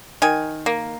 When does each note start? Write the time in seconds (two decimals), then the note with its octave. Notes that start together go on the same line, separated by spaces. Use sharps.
0.22 D#3 G#5
0.66 A#3